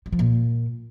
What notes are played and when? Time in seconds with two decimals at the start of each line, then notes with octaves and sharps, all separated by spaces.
0.06 G3
0.12 F3
0.19 A#2